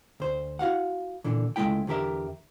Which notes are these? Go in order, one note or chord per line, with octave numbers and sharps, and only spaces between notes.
D2 C5
E4 F#4 F5 F#5
A#2 D3 E3
C#2 G#3 A3 E4 G5
E2 D3 G4 A#4 E5